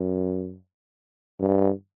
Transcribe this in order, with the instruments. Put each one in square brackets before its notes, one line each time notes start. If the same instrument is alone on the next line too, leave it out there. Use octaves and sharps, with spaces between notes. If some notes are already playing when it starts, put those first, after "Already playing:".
Already playing: [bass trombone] F#2
G2